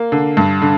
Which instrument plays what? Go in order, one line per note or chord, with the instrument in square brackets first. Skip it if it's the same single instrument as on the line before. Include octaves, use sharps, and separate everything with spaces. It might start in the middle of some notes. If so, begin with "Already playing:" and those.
Already playing: [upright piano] A#3
D3
G2
D3